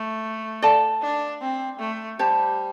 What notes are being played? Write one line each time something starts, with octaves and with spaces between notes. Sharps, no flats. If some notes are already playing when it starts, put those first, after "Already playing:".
Already playing: A3
A4 D5 F5 A5
D4
C4
A3
G3 G4 C5 A5